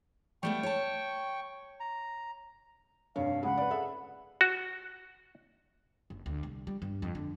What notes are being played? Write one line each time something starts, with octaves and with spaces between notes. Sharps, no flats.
G3 A3 B3 G5 C#6
C#5 A5
A#5
F1 G2 C#5 F5
C#2 G#3 G#4 F#5 B5
B4 D5
G#4 A4 E5
F#4
F#1
D2
C2
G3
G2
F2
D3